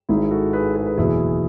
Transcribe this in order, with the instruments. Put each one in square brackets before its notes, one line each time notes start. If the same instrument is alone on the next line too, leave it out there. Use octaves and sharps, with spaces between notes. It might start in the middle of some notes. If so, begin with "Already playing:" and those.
[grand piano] G#1 G#2 D#3 E4 G#4
F#4 A4
G#4 B4
G#4 B4
G#4 B4
F#1 E2 B2 E4 G#4